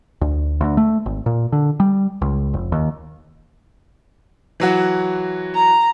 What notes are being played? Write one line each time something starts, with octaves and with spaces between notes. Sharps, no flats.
D2
D2
A3
G#1
A#2
D3
G3
C#2
F1
D#2
E3 F#3 F#4
A#5